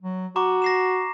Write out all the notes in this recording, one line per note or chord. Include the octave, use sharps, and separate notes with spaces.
F#3
F#4 A#5 C#6 D6
A#6 C7 E7